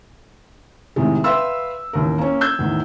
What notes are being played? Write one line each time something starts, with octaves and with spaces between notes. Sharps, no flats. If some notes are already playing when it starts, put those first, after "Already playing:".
A2 C3 D#3 G#3
B4 E5 F5 G5 C6 E6
A1 D#2 A#4
A#3 C#4
E6 G6 G#6
E2 A2 D#3